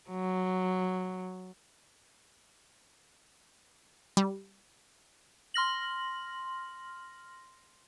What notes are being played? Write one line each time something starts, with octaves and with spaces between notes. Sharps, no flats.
F#3
G3
C6 F6 A#6 F#7